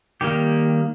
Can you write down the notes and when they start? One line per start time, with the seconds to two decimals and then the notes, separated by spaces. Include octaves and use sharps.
0.21 D#3 G3 A#3 G4